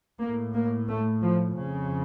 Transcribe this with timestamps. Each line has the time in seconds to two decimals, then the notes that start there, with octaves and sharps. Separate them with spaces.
0.20 A2 A#3
0.54 A#3
0.87 A3
1.22 F3
1.56 F2 C#3